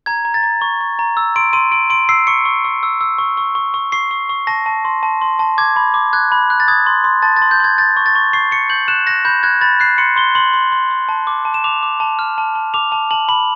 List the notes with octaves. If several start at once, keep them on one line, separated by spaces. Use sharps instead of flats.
A#5 G#6
A#5
A6
A#5
C#6
C#6
A#5
E6
C6 D7
C6 D#7
C6 D7
C6 D7
E6 C7
C#6 C#7
C#6
C#6
E6
E6
C#6
C#6
C#6
C#6
C#6 C7
C#6
C#6
A5 A#6
A5
C6
A5
C6
A5
D6 G#6
B5
D6
F#6 G#6
B5
F#6
A6
D#6 G#6
C6
C6
A5 A6
A6
C6
G6
C6 G#6
G6 A6
C#6
A6
C#6
C#6 C7
C#6 C#7
G6 F#7
F#6 E7
F#6 A#6
B5 G6
F#6 G#6
B5 A6
F#6 C7
C6 C#7
C6 G7
C6 F#7
C6
C6
C6
A5
D6
A5
E7
D6 F7
D6
A5
F6
A5
A5
D6 F7
A5
A5 F#7
B5 F#7